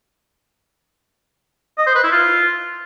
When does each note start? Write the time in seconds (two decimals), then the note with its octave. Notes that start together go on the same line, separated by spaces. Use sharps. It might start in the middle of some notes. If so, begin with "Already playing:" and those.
1.78 D#5
1.87 C5
1.95 B4
2.04 E4
2.12 F4